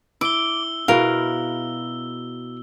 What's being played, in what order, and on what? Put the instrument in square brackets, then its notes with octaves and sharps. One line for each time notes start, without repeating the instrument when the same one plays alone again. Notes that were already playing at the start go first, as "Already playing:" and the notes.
[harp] E4 D7 [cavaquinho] D6 [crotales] E6 G7
[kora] B2 G#4 [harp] E4 F#4 [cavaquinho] A#4 F5